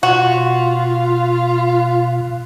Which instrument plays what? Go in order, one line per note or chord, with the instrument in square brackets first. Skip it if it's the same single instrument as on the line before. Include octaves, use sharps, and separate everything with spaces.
[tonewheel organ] B2 [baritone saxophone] F4 [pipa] F#4